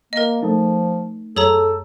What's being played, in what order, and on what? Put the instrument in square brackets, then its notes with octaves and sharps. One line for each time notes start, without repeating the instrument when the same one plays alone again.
[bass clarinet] A#3 [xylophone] A#4 D#5
[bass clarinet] F3 [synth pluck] A3 D#4
[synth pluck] F#2 [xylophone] G#4 C#5 A#5 [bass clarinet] A4